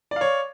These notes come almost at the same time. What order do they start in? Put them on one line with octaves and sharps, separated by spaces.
D5 F5 C#5